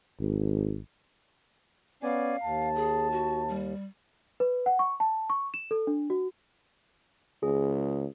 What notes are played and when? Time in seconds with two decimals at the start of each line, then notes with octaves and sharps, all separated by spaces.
0.20 G#1
2.03 B3 C#4 D5 F5 G#5
2.43 D#2 A5
2.75 G#4
3.11 F#4
3.49 G3
4.40 B4
4.66 F#5
4.79 C#6
5.00 A5
5.30 C#6
5.54 E7
5.71 A4
5.87 D4
6.10 F#4
7.43 C#2 G#4